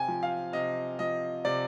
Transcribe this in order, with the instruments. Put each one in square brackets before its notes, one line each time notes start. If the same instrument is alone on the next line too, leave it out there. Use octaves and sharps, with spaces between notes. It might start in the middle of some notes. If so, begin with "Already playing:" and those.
Already playing: [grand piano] C3 G5 G#5
F3
F5
C3 D#5
F3 D#5
C3 D5